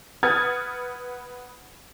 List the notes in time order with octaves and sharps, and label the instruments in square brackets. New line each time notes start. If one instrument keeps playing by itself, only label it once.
[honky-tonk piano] B4 F#5 D#6 F6 G#6 A6